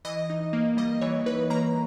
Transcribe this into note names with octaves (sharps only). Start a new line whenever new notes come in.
E3 D#5
D#4
A#3
G3 D#5
E3 C#5
D#4 B4
A#3 A#5